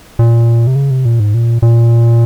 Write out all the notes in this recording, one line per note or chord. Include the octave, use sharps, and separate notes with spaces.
A#2
C3
C#3
C3
A#2
G#2
A#2
A#2